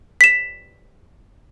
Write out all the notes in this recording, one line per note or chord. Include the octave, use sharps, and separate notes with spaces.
B6 E7